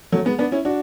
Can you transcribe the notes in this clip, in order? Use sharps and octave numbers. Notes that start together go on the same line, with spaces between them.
F#3 A3
G#3 B3
B3 D4
C#4 E4
D4 F#4